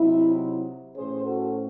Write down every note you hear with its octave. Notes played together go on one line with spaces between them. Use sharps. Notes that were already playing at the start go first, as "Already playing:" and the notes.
Already playing: C3 F#3 C4 D#4 E4
A2 E3 A3 C#4 G#4 C5
F#4 A4